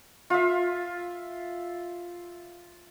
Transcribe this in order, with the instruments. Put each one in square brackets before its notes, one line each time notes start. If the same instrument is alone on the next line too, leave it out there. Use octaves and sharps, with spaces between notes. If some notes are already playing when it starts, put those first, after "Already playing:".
[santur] F4 E5